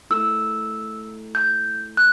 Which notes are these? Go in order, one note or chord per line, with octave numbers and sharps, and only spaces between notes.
A3 E4 A4 E6
G6
F#6